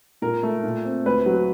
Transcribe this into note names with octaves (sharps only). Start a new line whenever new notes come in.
A#2 A#4
A3
A#2
C4
D2 B4
F#3